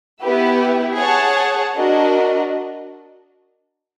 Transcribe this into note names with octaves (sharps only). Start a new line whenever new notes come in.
B3 E4 G4 B4 E5
G#4 C#5 F#5 A5
D4 F#4 A#4 D#5